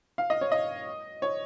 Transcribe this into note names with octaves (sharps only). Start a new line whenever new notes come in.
F5
D#5
C#5
D#5
C#5